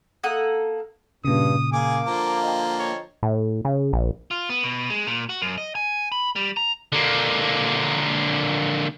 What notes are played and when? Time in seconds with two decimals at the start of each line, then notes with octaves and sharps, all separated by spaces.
0.23 A#3 A4 F#5 D#6
1.25 G2 A#2 C#3 D#6
1.73 A#3 G#4 G#5 D6
2.06 D3 F3 A#5
2.43 D#5 G5
2.79 C#5
3.23 A2
3.65 C#3
3.93 A#1
4.31 F4
4.50 B3
4.63 B2
4.90 G#3
5.07 A#2
5.29 F#4
5.42 F#2
5.58 D#5
5.75 G#5
6.12 B5
6.36 G3
6.57 A#5
6.92 D3 A#3